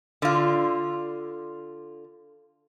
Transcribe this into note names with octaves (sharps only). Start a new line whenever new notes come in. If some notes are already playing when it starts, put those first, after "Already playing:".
D3 F4